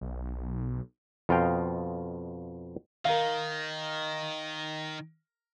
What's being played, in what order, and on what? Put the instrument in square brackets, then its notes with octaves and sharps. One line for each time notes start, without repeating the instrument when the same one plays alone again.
[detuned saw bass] B1
[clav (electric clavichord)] F2 B2 F4 D#5 F5 G5
[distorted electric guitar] D#3 [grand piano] A#4 F5